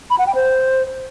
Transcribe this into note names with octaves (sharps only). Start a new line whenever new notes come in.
B5
F#5
G5
C5